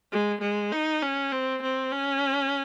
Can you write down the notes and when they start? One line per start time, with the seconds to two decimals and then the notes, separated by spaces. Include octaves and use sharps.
0.12 G#3
0.41 G#3
0.72 D#4
1.02 C#4
1.32 C4
1.62 C4
1.92 C#4